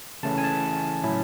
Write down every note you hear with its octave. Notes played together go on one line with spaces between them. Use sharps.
C#3 E3 A3 C#4 E4 A5
G#5
A5
A2 F#3 C#4 E4